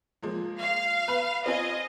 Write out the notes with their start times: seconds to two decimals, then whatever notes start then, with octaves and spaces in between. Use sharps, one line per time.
0.22 F3 G#3 A#3
0.61 F5
1.08 B4 B5 F7
1.46 C4 F4 D#5 G#5